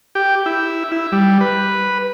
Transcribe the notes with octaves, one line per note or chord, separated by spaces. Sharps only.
G4
E4
E4
G3
B4